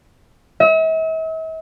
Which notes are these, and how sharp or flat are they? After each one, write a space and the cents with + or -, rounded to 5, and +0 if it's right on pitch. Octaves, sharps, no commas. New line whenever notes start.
E5 -45